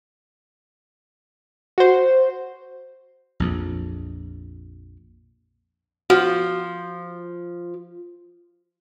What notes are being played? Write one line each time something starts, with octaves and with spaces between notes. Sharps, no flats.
F#4 C5
A#1 F2
F3 F#4